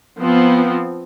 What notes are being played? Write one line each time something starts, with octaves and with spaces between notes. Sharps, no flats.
F3 B3 C4